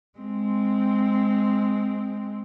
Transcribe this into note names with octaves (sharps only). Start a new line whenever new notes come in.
G#3 C4